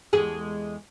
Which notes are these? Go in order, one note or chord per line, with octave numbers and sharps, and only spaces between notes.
E2 G#3 G#4